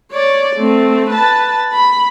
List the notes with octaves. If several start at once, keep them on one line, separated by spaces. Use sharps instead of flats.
C#5 D5
A3 C4
B4 A5
B5